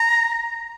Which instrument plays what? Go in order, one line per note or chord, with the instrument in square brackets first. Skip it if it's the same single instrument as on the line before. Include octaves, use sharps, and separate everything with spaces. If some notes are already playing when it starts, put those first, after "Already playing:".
Already playing: [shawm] A#5